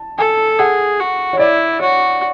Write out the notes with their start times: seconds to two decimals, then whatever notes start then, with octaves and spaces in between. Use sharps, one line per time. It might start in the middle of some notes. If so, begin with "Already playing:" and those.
Already playing: A5
0.19 A4 G#5
0.59 G#4 F#5
1.00 F#4
1.33 C#5
1.39 E4 D5
1.79 F#4 C#5